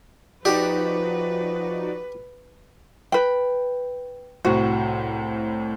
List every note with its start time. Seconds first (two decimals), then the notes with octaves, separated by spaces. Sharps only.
0.45 F3 D#4 F#4 G4 B4 D5
3.12 B4 G5
4.45 C2 A2 F#4 C5